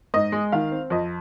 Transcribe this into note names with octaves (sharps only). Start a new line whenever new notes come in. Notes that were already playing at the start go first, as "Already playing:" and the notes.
G#2 D#5
G#3
D#3 F5
C4
F2 D#5